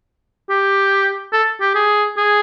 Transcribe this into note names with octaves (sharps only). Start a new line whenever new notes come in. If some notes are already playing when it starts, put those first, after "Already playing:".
G4
A4
G4
G#4
G#4